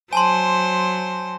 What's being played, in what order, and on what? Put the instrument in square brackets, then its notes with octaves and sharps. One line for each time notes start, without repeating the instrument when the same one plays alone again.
[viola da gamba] F#3 C5 [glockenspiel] G#5 A5 C6